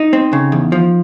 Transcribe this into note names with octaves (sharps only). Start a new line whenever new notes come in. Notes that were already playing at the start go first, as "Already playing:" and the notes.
Already playing: D#4
C4
C#3
E2
F3